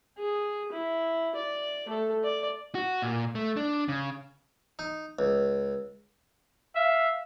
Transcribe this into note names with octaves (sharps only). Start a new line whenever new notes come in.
G#4
E4
D5
A3 A4
D5
F#4
A#2
A3
D4
C#3
D#4
C#2
E5 F5